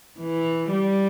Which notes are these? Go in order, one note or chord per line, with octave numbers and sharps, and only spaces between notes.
E3
G3